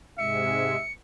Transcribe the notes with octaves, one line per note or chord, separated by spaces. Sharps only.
G#2 C3 G#3 E5 C#7